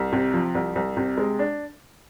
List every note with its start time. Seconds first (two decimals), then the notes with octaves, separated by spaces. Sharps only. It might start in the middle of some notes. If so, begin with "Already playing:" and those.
Already playing: C2
0.13 C3
0.34 F3
0.55 C2
0.75 C2
0.97 C3
1.18 G#3
1.39 D4